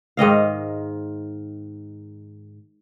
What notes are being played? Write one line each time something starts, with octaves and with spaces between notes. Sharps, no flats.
G#2 D#3 D#5 F5